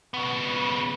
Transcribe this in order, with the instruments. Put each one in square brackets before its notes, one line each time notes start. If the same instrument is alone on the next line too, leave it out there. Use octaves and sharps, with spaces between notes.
[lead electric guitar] C#3 B3